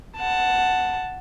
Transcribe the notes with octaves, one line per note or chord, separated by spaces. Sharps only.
F#5 A5